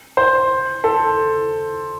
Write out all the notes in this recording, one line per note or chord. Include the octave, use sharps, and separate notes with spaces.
C5
A4